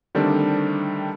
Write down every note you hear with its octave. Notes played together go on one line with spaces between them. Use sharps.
D3 D#3 G3 A3 C4 D4